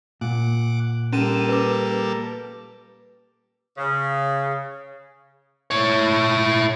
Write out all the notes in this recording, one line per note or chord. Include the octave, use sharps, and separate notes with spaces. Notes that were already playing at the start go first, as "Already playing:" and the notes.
A#2 F#5 D6
G3 A#3 C#4 A4 D#7 E7
B4 D6
C#3
E4 C#5